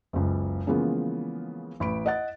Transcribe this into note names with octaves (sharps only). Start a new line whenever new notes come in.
F#1 C#2
C#3 E3 F3 G#3 A#3 B3
A1 B5 D7
D#5 F#5 A6